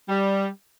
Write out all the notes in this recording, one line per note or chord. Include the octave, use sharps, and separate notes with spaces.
G3